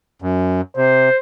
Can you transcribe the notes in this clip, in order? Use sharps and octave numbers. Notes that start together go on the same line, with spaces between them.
F#2
C3 C5